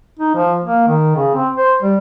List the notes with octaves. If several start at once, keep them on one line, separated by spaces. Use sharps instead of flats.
D#4
F3
A#3
D#3
C#3
C4
C5
G3